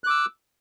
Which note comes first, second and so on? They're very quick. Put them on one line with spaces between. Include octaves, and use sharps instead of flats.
F#6 D6 E6